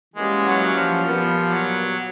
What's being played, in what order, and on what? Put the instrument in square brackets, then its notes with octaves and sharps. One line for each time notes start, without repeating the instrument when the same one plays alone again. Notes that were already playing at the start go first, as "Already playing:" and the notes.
[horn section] E3 G3 A#3 C#4 F#4 [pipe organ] G#3
[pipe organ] F#3
F3
[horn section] A#2 G3 B3 [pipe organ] F3
[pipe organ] F#3